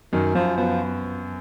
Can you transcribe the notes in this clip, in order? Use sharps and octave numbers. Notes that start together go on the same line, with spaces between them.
F#2 D#3
F#2 F3
F3 B3